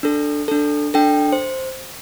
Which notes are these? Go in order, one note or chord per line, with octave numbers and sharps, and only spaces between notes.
D4 A4
D4 A4
D4 A4 G5
C5